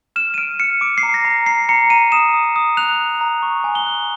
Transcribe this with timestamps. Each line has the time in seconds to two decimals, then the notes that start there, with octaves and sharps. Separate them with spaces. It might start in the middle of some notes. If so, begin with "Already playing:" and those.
0.16 F6 E7
0.34 D#7
0.38 F6 D7
0.60 F6 C#7
0.81 D6 D7
0.98 C7
1.03 A#5
1.14 A#6
1.25 A#5
1.46 A#5 C7
1.69 A#5 C#7
1.90 A#5 D#7
2.12 D#6 E7
2.34 D#6
2.56 D#6
2.77 F#6 F7
2.99 F#6
3.21 A#5
3.42 C#6
3.64 G#5
3.75 G7
3.86 F#6